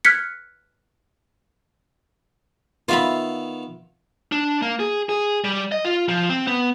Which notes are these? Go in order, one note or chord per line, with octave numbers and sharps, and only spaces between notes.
F6 F#6 G#6 B6 C#7
D#3 B3 F4 E5 F5 B5
D4
A#3
G#4
G#4
G3
D#5
F4
F3
C4
B3